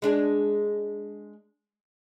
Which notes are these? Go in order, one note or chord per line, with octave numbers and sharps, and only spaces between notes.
G#3 D4 G#4